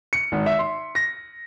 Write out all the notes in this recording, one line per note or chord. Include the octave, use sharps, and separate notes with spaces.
C#7
G#1
E5
C6
A#6